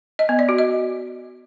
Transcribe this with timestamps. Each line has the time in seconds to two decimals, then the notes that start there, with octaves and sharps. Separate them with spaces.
0.19 D#5
0.29 B3
0.39 D5
0.49 F#4
0.58 D#5